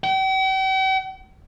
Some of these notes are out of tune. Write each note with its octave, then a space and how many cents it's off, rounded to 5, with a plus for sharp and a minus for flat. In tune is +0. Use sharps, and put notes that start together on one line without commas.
G5 -45